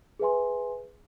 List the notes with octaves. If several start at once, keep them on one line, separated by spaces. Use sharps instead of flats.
G#4 B4 E5 G#5 C6